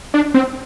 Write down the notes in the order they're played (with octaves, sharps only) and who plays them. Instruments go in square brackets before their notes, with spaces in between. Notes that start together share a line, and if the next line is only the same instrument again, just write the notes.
[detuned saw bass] D4
C4